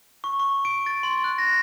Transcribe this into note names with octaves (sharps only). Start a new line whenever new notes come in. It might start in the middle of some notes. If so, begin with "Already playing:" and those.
C#6
C#6
D7
A6
C6
F#6
A#6